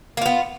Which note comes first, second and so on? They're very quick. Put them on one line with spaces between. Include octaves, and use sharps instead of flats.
A#3 F4 B3